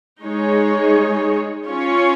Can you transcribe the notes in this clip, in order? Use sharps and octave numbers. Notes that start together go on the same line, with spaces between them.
G#3 D#4 G#4 C#5
C#4 F4 C#5